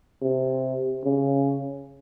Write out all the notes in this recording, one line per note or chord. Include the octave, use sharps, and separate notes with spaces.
C3
C#3